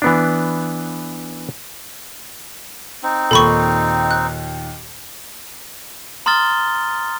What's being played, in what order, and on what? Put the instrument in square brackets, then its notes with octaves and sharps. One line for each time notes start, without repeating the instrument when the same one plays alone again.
[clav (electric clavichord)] E3 B3 D4
[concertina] C4 D#4
[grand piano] D#2 A#2 [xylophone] A4 B5 C#6
[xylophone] F#6
[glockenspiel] A#5 C6 D#6 F6 A6 G7